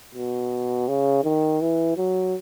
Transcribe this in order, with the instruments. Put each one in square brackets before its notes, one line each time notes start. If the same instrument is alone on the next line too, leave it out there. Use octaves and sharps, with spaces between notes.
[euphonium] B2
C#3
D#3
E3
F#3